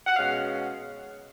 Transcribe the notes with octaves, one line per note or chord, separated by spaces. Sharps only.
F#5
B2 G#3 C#4 F5